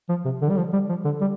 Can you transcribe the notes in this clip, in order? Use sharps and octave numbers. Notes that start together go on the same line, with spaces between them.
F3
C3
D3
G3
F3
G3
F3
D3
G3